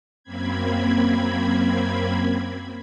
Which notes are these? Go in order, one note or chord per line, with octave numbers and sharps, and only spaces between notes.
F#2 A#3 C4 B5 G#6